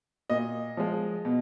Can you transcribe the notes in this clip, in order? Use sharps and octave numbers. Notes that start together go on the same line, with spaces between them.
A#2 D#5
F3 G#3
B2